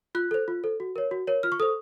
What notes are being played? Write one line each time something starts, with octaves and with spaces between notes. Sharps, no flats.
F4 F#6
A4 C5
F4
A4 C5
F#4
A#4 C#5
F#4
A#4 C#5
F4 F6
C#6
A4 C5 D#6